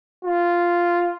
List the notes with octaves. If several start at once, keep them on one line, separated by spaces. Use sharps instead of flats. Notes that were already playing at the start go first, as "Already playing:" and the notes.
F4